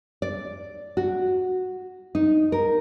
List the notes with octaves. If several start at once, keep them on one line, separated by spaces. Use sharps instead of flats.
D5
F#4
D#4
A#4